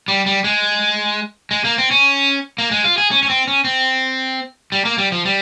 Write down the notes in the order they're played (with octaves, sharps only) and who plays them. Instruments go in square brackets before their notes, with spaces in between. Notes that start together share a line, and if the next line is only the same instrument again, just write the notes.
[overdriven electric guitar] G3
G3
G#3
G#3
A#3
C4
C#4
A#3
G#3
F4
G#4
C#4
C#4
C4
C#4
C4
G3
A#3
G3
F3
G3